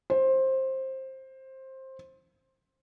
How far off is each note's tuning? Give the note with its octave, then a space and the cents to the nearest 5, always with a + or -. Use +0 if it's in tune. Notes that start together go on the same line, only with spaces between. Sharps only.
C5 +15